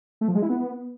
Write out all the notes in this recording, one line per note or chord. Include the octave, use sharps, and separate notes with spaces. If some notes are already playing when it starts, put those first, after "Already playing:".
A3
F3
G#3
E4
B3